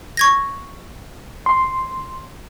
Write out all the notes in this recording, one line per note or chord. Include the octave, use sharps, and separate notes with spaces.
C#6 G#6 A#6
C6